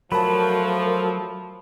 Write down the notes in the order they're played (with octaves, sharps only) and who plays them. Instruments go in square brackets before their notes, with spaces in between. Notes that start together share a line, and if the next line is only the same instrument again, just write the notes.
[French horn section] F3 A3 [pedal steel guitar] F#3 [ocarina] A#4 [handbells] A5 B5